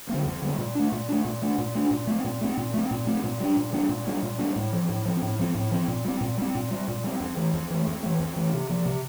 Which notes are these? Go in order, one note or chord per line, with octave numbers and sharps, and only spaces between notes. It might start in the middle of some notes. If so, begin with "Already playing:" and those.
D3 G3 A#3
F2
D3 G3 A#3
A#2
A3 D4
A#2
A3 D4
A#2
A3 D4
A#2
A3 D4
A#2
A3 C4
A#2
A3 C4
A#2
A3 C4
A#2
A3 C4
A#2
G3 A#3 D4
A#2
G3 A#3 D4
A#2
G3 A#3 D4
A#2
G3 A#3 D4
A2
F3 C4
A2
F3 C4
A2
F3 C4
A2
F3 C4
A#2
G3 C4
A#2
G3 C4
A#2
G3 C4
A#2
G3 C4
F2
E3 A3
F2
E3 A3
F2
E3 A3
F2
E3 A3
C3
F3 A#3
C3